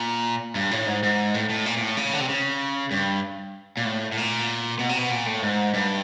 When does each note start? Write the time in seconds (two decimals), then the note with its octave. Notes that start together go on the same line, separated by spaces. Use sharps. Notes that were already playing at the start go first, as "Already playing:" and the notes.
Already playing: A#2
0.55 G2
0.71 A2
0.86 G#2
1.03 G#2
1.34 A2
1.49 A2
1.66 A#2
1.77 A#2
1.81 A2
1.97 C#3
2.13 D3
2.21 C3
2.29 C#3
2.91 G2
3.77 A#2
3.85 A2
4.12 A2
4.17 A#2
4.79 B2
4.89 C3
4.97 B2
5.11 A#2
5.26 A2
5.42 G#2
5.74 G2